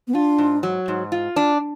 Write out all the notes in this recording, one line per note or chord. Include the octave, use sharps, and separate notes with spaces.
B3
D4 F4
G#2
F#3
G#2
F4
D4